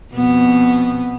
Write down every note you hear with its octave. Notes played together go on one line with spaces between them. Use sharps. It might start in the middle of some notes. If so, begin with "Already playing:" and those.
F2 B2 B3